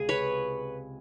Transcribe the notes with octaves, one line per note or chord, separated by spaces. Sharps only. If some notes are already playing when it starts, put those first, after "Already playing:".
Already playing: C#2 C3 G#4
B4 C#5